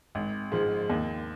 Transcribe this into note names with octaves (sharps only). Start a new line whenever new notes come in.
G#1
G#2 F3
D#2